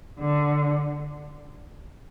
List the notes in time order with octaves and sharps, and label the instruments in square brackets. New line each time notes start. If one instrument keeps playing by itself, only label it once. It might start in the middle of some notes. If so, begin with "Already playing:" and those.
[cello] D3